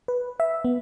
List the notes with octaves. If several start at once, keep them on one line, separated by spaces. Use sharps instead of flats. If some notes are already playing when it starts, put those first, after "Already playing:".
B4
E5
B3